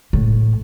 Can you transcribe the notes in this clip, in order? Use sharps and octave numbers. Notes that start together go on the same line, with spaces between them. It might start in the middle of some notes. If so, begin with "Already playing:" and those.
A2